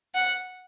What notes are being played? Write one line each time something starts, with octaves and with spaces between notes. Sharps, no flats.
F#5